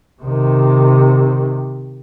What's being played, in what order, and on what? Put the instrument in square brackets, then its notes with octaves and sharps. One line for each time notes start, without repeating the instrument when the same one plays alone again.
[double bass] C3 D#3